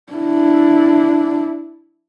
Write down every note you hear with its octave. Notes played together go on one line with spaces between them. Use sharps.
D4 E4